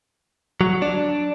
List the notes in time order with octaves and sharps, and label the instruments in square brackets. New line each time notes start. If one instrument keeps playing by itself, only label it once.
[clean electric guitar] F#3
D4